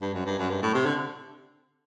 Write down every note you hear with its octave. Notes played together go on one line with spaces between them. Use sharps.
G2
F#2
G2
F#2
G2
A2
C3
D3